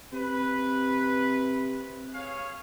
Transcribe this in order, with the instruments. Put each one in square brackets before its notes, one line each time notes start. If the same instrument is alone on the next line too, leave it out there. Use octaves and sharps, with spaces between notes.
[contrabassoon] C3 [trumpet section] B4
[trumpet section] G#4 C#5 F5